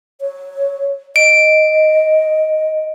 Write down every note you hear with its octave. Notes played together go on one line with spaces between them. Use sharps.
C#5
D#5 D7